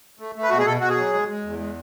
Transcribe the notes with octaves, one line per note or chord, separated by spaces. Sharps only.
A3
A3
B4
B2 F#4
G#4
B2 A4
B2 F#4
G#4
F#3
G#3
G#3
E2
G#3